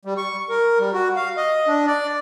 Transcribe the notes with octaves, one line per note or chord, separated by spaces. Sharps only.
G3
C#6
A#4
G3
F#4
F5
D#5
D4
D5